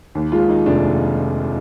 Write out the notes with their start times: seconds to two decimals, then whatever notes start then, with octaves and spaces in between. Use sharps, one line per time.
0.15 D#2
0.32 G#3 F4
0.49 D#3 D#4
0.66 F1 D4